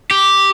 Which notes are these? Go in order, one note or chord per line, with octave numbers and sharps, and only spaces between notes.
G4